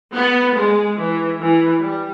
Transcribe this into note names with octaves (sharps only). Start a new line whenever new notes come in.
B3
G#3
E3
E3
G3